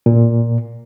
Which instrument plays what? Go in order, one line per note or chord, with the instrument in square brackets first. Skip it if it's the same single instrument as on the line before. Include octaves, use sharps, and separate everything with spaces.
[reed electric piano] A#2